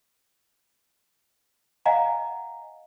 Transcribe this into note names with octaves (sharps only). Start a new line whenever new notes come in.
D#5 F5 F#5 G#5 A#5